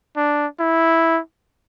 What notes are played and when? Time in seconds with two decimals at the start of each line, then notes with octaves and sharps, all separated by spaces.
0.16 D4
0.60 E4